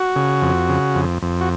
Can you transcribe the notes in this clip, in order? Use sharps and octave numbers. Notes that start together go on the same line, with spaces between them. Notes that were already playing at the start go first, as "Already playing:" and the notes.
Already playing: F#4
C#3
F2
C#3
F2
F2
F#4